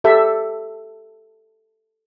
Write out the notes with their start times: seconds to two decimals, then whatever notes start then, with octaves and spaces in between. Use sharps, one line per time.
0.04 G4 A4 E5